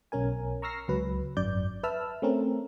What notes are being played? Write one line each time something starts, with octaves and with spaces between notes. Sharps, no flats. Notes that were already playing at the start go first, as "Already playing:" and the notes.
B1 C#4 A#4 G#5
A#5 C#6 E6 F6 A#6 C7
C#2 F#3 B4
G#1 F#2 D5 G6
B4 E5 A5 E6 F6
A3 C4 C#4 A#4